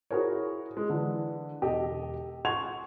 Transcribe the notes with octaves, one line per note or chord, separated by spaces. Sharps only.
E4 F#4 G#4 A#4 C5 C#5
G#3
D3 E3
E1 G4 A4 D#5
F#5 C6 C#6 G#6 F7